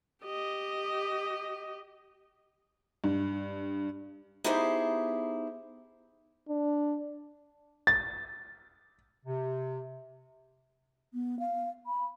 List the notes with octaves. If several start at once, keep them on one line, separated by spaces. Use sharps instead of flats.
G4 D#5
G2
B3 D#4 E4 G4 G#4 C5
D4
A6
C3
B3
F5
B5